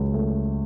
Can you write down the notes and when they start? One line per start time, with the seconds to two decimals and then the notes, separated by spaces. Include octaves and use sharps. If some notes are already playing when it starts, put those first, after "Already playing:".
Already playing: C#2 C#3 F#3
0.14 A3